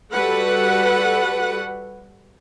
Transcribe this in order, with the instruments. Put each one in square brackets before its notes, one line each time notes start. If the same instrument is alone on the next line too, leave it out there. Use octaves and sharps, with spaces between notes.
[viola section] G3 F#4 A4 B4 F#5